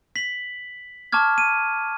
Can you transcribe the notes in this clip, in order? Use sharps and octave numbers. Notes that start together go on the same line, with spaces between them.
B6 F#7
A5 C#6 D6 F6 G#6
D#7